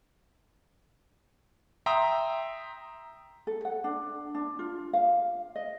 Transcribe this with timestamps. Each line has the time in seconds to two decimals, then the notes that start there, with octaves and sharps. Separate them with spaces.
1.86 E5 G5 A#5 C6 D#6 E6
3.47 A4
3.65 F#5
3.84 D4
4.35 D4
4.59 F4
4.93 F5
5.55 D#5